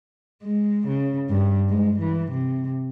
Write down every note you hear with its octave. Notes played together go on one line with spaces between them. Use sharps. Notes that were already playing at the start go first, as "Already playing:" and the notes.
G#3
C#3
G2
G#3
E3
C3